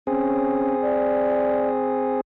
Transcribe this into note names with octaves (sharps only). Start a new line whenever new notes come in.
C4 C#4 G#4
D5